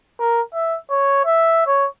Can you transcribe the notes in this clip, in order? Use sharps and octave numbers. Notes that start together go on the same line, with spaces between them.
A#4
E5
C#5
E5
C#5